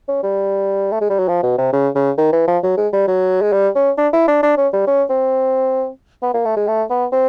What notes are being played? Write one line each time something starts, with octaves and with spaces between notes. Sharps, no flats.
C#4
G3
A3
G#3
G3
F#3
F3
B2
C3
C#3
C#3
D#3
E3
F3
F#3
G#3
G3
F#3
G#3
G3
C#4
D4
E4
D4
D4
C#4
G3
C#4
C4
B3
A#3
A3
G#3
A3
B3
C4